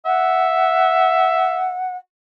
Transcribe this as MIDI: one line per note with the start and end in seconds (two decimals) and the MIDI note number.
0.06 1.79 76
0.06 1.97 78